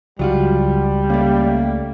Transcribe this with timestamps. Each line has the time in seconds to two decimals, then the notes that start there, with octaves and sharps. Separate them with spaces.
0.19 C#2 F#3 G3 F4 F#4
1.10 C#3 A3 A#3